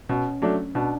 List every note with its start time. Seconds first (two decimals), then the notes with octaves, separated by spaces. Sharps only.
0.09 B2 C#4
0.42 F#3 A3 D4
0.75 B2 D4